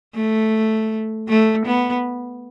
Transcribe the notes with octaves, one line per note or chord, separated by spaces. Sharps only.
A3
A3
B3